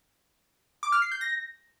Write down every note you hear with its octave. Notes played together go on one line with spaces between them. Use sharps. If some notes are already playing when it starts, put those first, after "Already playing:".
D6
F6
C7
G6
A#6